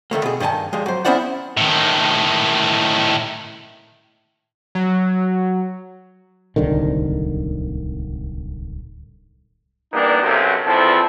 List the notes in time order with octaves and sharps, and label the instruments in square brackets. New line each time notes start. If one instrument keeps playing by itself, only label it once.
[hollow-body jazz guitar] D2 D#3 A3 A#3
B2 G#4
G2 D#3 C5 G#5 A5
F3 G3 G#3
F#3 C5
B3 C#4 E4 C5 D5 F#5
[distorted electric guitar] A2 D#3
[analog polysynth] F#3
[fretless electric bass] D1 C2 D3 D#3
[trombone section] E3 G3 A#3 B3 D4 D#4
B1 F#2 C3
A#1 E2 F3 C4 E4 A4